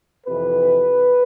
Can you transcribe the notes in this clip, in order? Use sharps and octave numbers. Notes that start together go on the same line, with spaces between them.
F2 C3 E3 B4